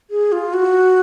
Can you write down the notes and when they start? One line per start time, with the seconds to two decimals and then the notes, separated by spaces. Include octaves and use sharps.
0.10 G#4
0.32 F4
0.54 F#4